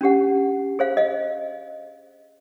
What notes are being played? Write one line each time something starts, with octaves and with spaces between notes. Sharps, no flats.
C#4 D4 G4 F#5
G#4 C5 F5
D#5 F5